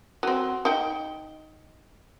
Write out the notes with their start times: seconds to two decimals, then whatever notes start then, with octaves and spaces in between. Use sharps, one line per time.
0.23 F#3 C4
0.65 D#4 G5